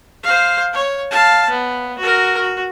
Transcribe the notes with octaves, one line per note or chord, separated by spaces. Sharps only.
C5 F5
C#5
F5 A5
B3
F#4 A#4
F#4